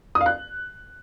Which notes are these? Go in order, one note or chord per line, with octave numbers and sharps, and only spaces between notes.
D#6
F5
F#6